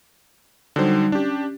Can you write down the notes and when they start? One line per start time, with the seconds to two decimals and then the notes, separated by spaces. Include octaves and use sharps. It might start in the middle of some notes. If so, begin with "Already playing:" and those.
0.76 D3 F#3 G3 D#4 C5
1.12 C#4 D4 G4